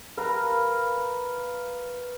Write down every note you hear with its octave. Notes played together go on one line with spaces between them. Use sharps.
A#4 B4 F5 A#5